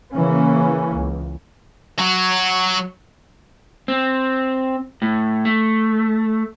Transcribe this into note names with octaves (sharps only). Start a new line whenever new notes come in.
C#3 E3 A#3 C#4
C#2
F#3 F#4
C4
A2
A3